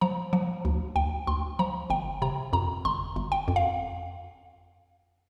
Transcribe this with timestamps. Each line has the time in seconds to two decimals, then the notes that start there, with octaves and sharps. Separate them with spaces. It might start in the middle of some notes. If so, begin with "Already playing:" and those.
0.01 F3 A#5
0.33 F3
0.65 D2
0.96 D2 G5
1.27 D2 C6
1.59 F3 A#5
1.90 G1 G5
2.22 C3 A#5
2.53 F2 A#5
2.85 G1 C6
3.16 G1
3.32 G5
3.48 F2
3.56 F5